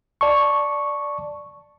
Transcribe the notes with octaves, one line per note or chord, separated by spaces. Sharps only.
D5 A5 C#6